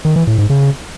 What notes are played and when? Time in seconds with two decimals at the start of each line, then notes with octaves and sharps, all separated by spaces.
0.05 D#3
0.16 E3
0.27 A2
0.38 G#2
0.50 C#3